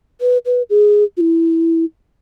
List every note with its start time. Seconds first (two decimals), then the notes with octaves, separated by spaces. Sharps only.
0.21 B4
0.46 B4
0.70 G#4
1.17 F4
1.21 E4